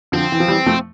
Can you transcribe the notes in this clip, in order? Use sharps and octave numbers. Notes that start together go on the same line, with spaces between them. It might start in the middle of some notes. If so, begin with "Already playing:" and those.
D3 F3 C4
E3
F3
E3 G3
F3 A3